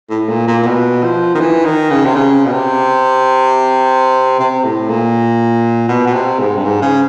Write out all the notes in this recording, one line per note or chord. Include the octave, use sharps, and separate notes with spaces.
A2
A#2
A#2
A#2
B2
F3
D#3
E3
D#3
C#3
C3
C#3
B2
C3
C3
A2
A#2
B2
B2
C3
G#2
G2
G#2
C#3